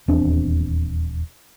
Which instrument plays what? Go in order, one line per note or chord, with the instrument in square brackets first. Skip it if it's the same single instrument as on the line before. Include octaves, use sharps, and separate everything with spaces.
[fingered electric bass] D#1 E2 C4 D4